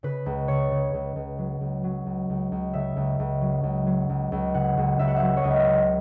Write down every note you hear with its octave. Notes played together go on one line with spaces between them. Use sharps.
C#3 B4
C#2
C#3 C#5
C#3
C#2
C#2
F#3
C#2
F#3
C#2
C#2
C#2
C#3 E5
C#2
C#2
F#3
C#2
F#3
C#2
C#2
C#3 F#5
C#2
C#2 E5
F#5
E5
F#3
C#5
C#2 D#5
C#3